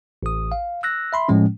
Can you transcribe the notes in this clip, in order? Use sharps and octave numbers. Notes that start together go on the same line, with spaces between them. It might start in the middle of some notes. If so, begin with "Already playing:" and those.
A1 D#6
F5
E6 F#6 A#6
E5 B5 C6
A2 F3 G#3 C#4